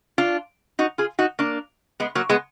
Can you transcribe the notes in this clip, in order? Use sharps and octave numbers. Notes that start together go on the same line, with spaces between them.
D4 F4
D#4 F#4
F4 G#4
D#4 F#4
A#3 D4
G#3 B3
F#3 A#3
G#3 B3